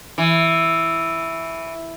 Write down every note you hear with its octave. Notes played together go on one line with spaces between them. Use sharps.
E3